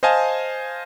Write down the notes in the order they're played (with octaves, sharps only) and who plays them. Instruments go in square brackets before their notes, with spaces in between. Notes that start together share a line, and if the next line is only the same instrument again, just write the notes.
[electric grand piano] C5 D#5 F5 G#5 A5